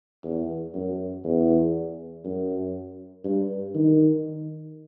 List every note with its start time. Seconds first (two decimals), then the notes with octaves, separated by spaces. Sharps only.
0.24 E2
0.74 F#2
1.24 E2
2.24 F#2
3.24 G2
3.75 D#3